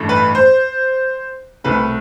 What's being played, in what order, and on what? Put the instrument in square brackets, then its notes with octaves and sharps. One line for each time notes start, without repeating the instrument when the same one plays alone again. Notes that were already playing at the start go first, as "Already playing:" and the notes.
Already playing: [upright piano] A1 G2 E3 A3
B4
C5
C2 B2 A3 B4